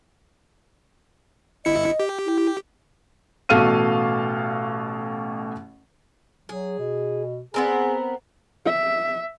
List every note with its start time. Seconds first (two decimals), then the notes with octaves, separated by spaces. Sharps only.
1.65 G1 E4 D#5 C#7
2.00 G4
2.26 E4
3.49 A1 B2 A4 F5 F6 D#7
6.49 F#3 G#4
6.79 B2
7.54 B3 C4 G#4 A#4
8.66 E5